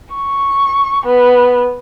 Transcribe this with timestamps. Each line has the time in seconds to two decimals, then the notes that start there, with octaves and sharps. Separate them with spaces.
0.14 C#6
1.06 B3